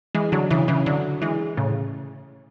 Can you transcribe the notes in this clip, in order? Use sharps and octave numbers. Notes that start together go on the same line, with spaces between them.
E3 G#3
D3 F#3
C#3 E3
C#3 E3
D3 F#3
E3 G#3
A2 C#3